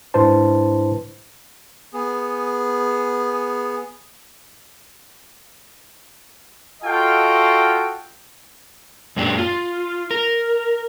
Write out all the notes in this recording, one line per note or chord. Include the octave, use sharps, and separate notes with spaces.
G#2 D4 E4 B4 C5 A5
B3 G#4
F4 F#4 A4 D#5 F5 G5
F#2 A#2 D4 G4
F4
A#4